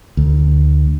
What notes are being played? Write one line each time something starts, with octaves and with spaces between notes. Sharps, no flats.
D2